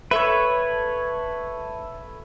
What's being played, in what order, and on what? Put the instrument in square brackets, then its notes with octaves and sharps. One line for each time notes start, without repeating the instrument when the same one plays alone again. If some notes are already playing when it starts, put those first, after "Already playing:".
[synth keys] A4 E5 [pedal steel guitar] B4 C#5